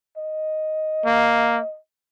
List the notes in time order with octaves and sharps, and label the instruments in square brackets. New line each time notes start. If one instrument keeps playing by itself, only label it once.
[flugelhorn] D#5
[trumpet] A#3